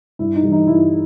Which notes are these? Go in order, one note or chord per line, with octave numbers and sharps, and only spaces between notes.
G2 E4
D#4
E3 G3
D#4
G2 E4